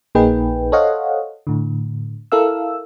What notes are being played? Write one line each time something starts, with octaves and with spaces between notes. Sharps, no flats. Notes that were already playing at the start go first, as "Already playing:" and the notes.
A#1 A#3 D#4 G#4 B4 G5
A4 C5 C#5 D#5 F5 F#5
A2 D3
E4 A4 A#4 F5 E6